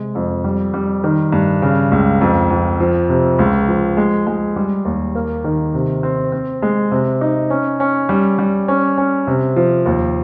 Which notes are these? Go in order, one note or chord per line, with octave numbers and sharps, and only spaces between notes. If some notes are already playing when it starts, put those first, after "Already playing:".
Already playing: C3 G#3
F2
G3
G3
D#3
G2
C#3
C#2
F2
F2
F3
C3
C#2
F3
G#3
G#3
G3
D#2
A#3
D#3
C3
C4
C4
G#3
C3
D#4
C#4
C#4
G3
G3
C#4
C#4
C3
F3
D#2